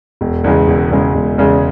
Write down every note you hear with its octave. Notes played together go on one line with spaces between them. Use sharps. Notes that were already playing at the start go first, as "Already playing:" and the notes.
E1
E2 C#3 G#3
E1
E2 C#3 G#3
E1
E2 C#3 G#3